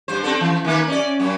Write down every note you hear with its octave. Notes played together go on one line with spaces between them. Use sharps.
G2 C5
C4 D4 A4
E3
D#3 A#3 B4
C#4 D5
F#2 C#4